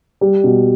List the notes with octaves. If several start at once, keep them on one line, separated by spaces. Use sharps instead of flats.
G3
B2